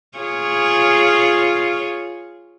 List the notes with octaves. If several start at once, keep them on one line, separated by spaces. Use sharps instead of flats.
F4 G#4 C#5